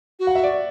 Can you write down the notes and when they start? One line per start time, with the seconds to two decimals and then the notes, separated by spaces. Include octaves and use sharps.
0.19 F#4
0.27 F#5
0.35 E5
0.44 D5